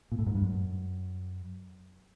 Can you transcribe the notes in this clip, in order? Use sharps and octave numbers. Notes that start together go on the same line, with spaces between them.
A#2
A2
G#2
G2
F#2